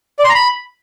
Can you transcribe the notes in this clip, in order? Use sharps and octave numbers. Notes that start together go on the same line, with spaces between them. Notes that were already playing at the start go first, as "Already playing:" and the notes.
D5
C6
A#5
B5